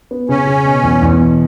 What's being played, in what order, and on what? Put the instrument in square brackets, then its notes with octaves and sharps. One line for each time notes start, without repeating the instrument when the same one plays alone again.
[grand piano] B3
[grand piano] C#3 [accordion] C#4
[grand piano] C#3
B2
E2
E2
B2